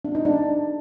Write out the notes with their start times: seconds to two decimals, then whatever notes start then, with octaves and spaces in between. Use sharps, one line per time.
0.05 D4
0.15 D#4
0.25 D4